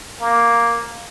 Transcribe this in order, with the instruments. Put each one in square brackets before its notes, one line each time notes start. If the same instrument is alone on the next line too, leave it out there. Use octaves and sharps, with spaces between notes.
[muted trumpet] A#3